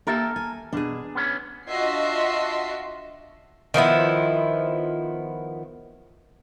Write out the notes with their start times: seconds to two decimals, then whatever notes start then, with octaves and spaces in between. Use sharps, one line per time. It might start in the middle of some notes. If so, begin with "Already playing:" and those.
0.07 A#3 G4 A4 A#4 E5
0.36 G#5
0.73 B2 D4 G#4
1.15 B3 C#4
1.69 D4 F4 F#4 D#5 E5 C7
3.74 D#3 F3 B3 E4